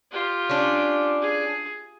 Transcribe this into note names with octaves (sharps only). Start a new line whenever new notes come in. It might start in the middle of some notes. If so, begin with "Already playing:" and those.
F4 G4
C#4 D4
G#4